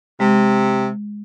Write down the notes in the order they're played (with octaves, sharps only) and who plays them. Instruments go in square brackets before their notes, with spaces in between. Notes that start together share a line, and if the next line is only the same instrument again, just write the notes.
[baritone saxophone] C3 [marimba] G#3